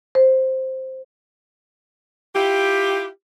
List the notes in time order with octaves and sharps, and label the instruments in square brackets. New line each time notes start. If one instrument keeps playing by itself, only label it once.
[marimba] C5
[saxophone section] E4 F4 G4